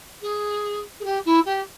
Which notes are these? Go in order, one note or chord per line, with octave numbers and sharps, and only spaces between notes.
G#4
G#4
G4
E4
G4